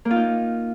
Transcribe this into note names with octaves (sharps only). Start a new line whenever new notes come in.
A#3
F4
D#4